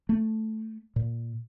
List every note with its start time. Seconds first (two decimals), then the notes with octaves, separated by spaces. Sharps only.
0.09 A3
0.96 A#2